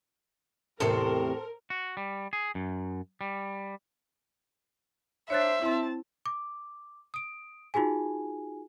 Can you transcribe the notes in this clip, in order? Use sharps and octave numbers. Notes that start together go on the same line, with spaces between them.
E2 A2 C3 A4 A#4 C5
F#4
G3
G#4
F#2
G3
D4 C5 C#5 E5 F#6 A6
C4 E4 A5 C6
D6
D#6 D7
D#4 F4 F#4 G#4 G#5